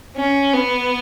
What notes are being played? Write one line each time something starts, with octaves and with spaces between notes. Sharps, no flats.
C#4
B3